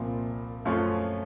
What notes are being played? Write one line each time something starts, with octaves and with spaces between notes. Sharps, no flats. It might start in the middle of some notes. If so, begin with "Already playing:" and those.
Already playing: C2 A#2 F3
F#2 F3 A3 C#4 F4